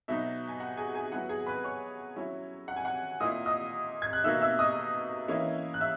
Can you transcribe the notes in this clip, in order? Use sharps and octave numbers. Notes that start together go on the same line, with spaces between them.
B2 F#3 B3 D#4 E5
G#5
F#5
G#4 G#5
G#4 G#5
F#3 B3 E4 F#5
G#4 G#5
B4 B5
C#5 C#6
F#3 C#4 E4
F#5
G#5
F#5
A#2 A#3 E4 D#5 D#6
D#5 D#6
G#6
F#6
B2 A#3 D#4 E5 E6
E5 E6
D#5 D#6
E3 A#3 C#4 E4
F#6
E5 E6